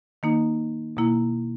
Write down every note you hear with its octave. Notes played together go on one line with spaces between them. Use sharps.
D#3 A#3 D#4
B2 A#3 E4